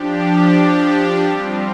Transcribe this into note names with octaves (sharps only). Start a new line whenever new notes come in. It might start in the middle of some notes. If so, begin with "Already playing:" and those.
Already playing: F3 D4 G4
G3 C4 F4